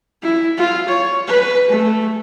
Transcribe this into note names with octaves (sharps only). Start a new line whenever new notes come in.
E4
F4
C#5
B4
A3